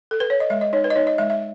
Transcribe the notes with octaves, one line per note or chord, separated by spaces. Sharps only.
A4
B4
C#5
D#5
G#3 E5
D#5
D#4 C#5
B4
D#5
D#4 C#5
D#5
G#3 E5
E5